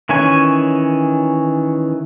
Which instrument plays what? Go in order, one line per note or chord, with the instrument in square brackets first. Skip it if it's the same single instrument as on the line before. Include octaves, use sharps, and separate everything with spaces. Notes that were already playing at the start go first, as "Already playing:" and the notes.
[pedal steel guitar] D#3 E3 C#4 C#5 G#5